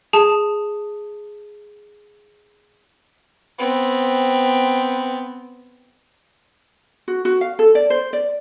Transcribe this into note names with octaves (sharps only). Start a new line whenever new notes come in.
G#4 A5
B3 C4
F#4
F#4
F5
A4
D5
C5
D5